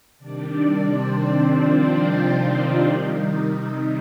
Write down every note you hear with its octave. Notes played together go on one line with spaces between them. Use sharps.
C3 D#3 G3 D4 D5
C4 C5
F3 F4
D#3 D#4
C3 G3
D#3 D#4